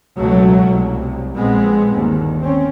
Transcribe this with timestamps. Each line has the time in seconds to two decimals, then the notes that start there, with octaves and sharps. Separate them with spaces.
0.17 C#2 B2 F#3 A3
0.71 C2
1.34 A#1 G#3 B3 C4
1.91 G1 D#2
2.40 C4 C#4